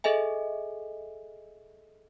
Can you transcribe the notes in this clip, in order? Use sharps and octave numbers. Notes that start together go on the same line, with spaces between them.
G#4 A4 D#5 E5 G#5